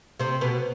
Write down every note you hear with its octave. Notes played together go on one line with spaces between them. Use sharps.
C3 C4
B2 B3